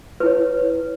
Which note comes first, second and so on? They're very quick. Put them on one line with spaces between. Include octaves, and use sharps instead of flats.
B4 E4 C#5